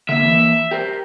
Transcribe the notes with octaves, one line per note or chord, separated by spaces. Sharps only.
D3 A#3 E5
E3 A#3
G4 A#4 C5